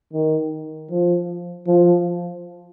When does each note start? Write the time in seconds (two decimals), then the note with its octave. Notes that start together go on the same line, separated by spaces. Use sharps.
0.13 D#3
0.91 F3
1.67 F3